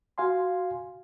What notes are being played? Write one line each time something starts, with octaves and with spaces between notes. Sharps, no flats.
F#4 F5 G#5 C6